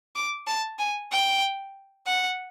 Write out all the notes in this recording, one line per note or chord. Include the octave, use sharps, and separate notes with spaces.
D6
A5
G#5
G5
F#5